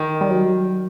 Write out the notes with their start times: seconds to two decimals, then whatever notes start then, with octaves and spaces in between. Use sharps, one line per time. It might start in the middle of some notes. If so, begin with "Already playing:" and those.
Already playing: D#3
0.21 G3
0.30 F#3